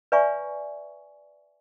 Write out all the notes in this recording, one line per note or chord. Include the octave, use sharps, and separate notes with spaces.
B4 D5 E5 G#5 A#5 C#6